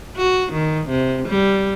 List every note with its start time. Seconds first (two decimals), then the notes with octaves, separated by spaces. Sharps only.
0.16 F#4
0.52 D#3
0.89 C3
1.28 G3